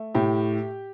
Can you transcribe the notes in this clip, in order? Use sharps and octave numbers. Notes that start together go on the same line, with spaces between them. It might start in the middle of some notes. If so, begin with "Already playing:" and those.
Already playing: A3
A2 G4